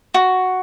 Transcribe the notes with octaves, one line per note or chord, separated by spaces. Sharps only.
F#4